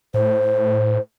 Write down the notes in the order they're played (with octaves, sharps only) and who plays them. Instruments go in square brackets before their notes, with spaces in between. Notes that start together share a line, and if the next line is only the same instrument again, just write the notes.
[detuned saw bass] A2 [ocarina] C5